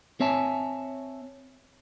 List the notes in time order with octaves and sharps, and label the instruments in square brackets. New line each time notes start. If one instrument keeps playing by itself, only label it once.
[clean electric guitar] C4 C#5 E5 G#5 A5